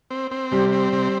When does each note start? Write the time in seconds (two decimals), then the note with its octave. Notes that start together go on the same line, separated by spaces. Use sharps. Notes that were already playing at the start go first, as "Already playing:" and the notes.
0.11 C4
0.31 C4
0.51 C3 G3
0.72 C4
0.93 C3